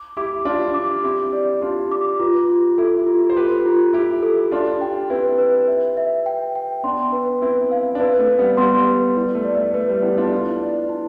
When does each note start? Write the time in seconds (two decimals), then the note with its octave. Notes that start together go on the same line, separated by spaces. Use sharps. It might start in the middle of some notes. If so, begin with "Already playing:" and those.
Already playing: D6
0.17 E4 G4 D6
0.45 D4 F4 G4
0.74 D6
1.04 C4 E4 G4
1.33 D5
1.61 D4 F4 G4
1.92 D6
2.20 F4 G4 B4
2.49 F4
2.78 E4 G4 A4
3.06 F4
3.30 C5
3.36 G4 A4 B4
3.65 F4
3.93 E4 F4 G4
4.23 A4
4.51 D4 F4 G4
4.81 G5
5.10 C4 E4 B4
5.38 B4
5.68 E5
5.97 E5
6.26 G5
6.55 G5
6.83 B3 D4 C6
7.12 B4
7.42 C4 E4 B4
7.72 F5
7.95 D4
7.99 C4 E4 B4
8.19 A3
8.28 B4
8.39 G3 B3
8.57 G3 B3 C6
8.87 B4
9.16 G3 E4
9.35 A3
9.44 D5
9.55 A3
9.74 A3 B4
9.89 G3
10.02 G3 B3 E4
10.18 D4 F4
10.32 D4 E4 F4
10.62 D5
10.89 E4